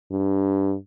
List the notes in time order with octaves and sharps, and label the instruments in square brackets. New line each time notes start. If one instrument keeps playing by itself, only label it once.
[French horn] G2